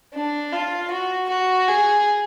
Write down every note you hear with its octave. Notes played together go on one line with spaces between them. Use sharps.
D4
F4
F#4
F#4
G#4